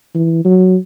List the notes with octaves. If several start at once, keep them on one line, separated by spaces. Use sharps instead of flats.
E3
F#3